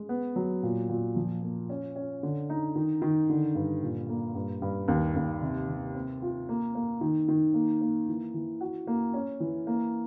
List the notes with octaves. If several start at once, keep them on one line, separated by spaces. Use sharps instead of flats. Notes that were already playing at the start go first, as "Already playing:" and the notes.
Already playing: G#3
B3
F#3
A#2
A#2
F3
A#3
C#4
C#4
D3
D#4
D#3
D#3
D3
G2
A#2
A#3
G2
G2
D#2
D#2
C3
C3
C4
F4
A#3
A#3
D#3
D#3
A#3
A#3
E3
E3
F#4
A#3
C#4
E3
A#3